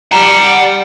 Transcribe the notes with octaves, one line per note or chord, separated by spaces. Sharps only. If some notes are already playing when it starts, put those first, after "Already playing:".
G3 F#5 A5 A#5